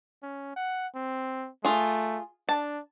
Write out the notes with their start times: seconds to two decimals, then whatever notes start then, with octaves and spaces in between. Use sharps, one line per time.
0.23 C#4
0.56 F#5
0.95 C4
1.65 A3 F4 G#4
2.49 D4 A5